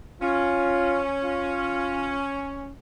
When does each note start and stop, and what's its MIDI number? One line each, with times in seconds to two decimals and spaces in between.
0.22 2.69 61
0.22 1.02 65
1.22 2.22 65